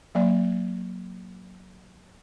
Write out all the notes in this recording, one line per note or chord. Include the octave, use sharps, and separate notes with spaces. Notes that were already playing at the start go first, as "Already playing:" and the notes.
F#3 A#3 D5